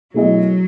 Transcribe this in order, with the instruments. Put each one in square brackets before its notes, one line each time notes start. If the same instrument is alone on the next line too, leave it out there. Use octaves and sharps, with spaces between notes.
[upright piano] B2 A3 E4 G#4 D#5 [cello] F#3